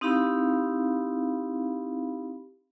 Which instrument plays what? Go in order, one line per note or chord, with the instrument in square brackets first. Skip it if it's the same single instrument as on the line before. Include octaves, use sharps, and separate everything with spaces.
[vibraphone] C4 D#4 E4 G4 F5 B5